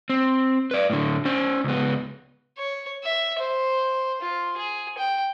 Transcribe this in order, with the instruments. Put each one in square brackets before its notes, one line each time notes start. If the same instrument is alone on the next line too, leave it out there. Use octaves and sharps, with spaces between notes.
[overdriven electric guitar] C4
B4 D5
A2 D3
C#4 C5
C#2 B3
[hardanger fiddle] C#5
E5
C5
F4
G#4
G5